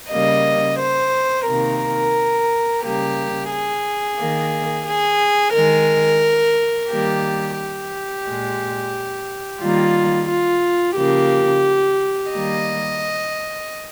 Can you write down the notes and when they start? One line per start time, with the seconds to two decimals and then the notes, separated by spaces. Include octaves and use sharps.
0.10 C#3 G3 A#3 D#5
0.79 C5
1.46 C3 D#3 A#3 A#4
2.82 C#3 G3 A#3 G4
3.51 G#4
4.18 D#3 A#3
4.87 G#4
5.54 D#3 G#3 A#4
6.89 D#3 G3 A#3 G4
7.58 G4
8.26 A#2 G#3
9.61 D#3 G3 A#3 F4
10.29 F4
10.97 C#3 F3 A#3 G4
12.32 D#3 G3 A#3 D#5